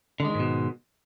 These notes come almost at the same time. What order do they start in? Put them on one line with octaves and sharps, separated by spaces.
D3 G#3 D#3 G#2 B2